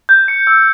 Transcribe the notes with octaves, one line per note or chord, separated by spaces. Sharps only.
G6
C#7
E6